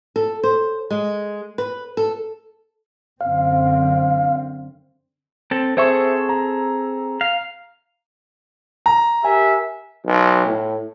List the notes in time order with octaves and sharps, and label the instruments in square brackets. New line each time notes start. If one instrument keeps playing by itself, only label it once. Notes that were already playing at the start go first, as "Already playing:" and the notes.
[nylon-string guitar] A4
C5
G#3
B4
A4
[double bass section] F#2 D3 C4 [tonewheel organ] F5
[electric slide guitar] C4 A4
[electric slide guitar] C4 G#4 A4 [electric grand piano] C5 E5 C#6
[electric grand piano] A#5
[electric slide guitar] F5
[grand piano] A#5
[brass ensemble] G4 A#4 E5 [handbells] G#5
[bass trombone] B1
A2